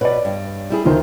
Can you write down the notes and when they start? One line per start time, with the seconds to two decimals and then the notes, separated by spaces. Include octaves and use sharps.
0.01 B2 B4 C#5 D5
0.25 G2
0.70 G3 E4 G#4
0.85 D2 D#3 D#4 F4 C5